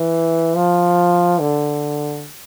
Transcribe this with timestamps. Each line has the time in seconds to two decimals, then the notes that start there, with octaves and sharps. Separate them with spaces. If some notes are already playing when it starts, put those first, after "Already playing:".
Already playing: E3
0.56 F3
1.40 D3